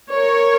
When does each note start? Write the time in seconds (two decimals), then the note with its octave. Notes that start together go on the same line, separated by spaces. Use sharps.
0.13 A#4 C#5